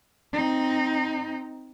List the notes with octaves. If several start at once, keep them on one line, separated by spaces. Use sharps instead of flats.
C4 D#4